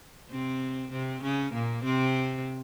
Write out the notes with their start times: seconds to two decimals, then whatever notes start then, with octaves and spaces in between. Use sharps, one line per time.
0.31 C3 C4
0.92 C3 C4
1.22 C#3 C#4
1.53 A#2 A#3
1.84 C3 C4